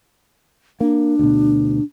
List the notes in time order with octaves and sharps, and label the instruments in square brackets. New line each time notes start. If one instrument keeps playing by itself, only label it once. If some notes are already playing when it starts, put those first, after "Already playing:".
[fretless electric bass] A#3 [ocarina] D4
[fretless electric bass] D2 B2